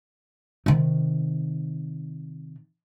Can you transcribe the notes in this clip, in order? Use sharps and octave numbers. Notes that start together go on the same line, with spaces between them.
C3 D#3